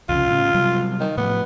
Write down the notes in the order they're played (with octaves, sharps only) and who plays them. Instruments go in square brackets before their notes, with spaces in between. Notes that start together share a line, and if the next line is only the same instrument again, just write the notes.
[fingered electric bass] C2 F2 C#3 [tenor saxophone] F4
[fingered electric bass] A2 C#3
C3 F#3 G3
[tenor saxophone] D#3
[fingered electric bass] A2 F3 [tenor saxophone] B3